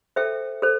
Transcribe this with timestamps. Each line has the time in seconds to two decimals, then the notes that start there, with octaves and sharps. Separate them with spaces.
0.16 A4 C5 E5 G5
0.62 A4 C5